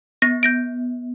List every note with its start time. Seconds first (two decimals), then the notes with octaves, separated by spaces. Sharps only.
0.22 B3 A#6
0.43 G6 A#6 D7